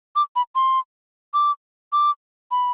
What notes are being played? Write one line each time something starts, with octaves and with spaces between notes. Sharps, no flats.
D6
B5
C6
D6
D6
B5